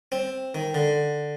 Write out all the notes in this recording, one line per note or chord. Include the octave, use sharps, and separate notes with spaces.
C4
D#3
D3